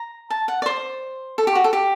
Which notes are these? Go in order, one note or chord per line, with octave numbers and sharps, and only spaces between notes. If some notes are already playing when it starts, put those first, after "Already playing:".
Already playing: A#5
A5
F#5
D5
C5
A4
G4
F#4
A4
G4